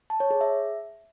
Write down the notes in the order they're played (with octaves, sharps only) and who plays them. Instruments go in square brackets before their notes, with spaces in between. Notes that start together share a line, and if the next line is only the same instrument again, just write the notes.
[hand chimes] A5
C#5
G#4
E5